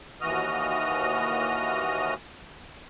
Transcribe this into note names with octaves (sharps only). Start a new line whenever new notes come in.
D#2 E3 F#4 D#5 D#6 F6